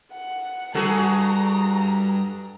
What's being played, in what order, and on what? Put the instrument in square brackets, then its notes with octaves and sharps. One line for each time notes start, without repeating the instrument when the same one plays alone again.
[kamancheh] F#5
[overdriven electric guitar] C#2 G2 [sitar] F#4 G#4 A4 [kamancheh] A#5